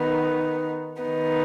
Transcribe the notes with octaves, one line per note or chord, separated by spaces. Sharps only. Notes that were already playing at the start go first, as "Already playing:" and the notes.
Already playing: D#3 B3 D#4
D#3 B3 D#4